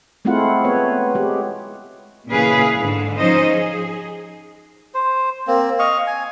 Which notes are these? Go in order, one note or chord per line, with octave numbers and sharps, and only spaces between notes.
G#3 A3 C4 E4 F4 F#5
B3 B4 C#5
G#3 G4
A#2 C#3 E3 G#4 B4 F5
G#2 D3
F3 C#4 D#4 C5 D#5
G#4
C5
A#3 C4
D#5 F5 C#6
G#5